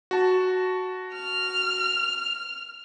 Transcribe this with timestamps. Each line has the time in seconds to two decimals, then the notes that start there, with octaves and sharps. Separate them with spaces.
0.11 F#4 A5
1.14 F6